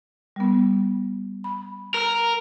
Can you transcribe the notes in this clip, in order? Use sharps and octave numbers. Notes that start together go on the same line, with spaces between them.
G3 B3
B5
A#4